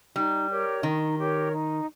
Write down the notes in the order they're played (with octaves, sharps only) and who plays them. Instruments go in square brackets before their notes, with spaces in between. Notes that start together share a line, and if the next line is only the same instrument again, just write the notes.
[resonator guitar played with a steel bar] G3 [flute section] D#4
[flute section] G4 A#4 C#5
[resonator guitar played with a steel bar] D#3 [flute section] D#4
[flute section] G4 A#4 C#5
D#4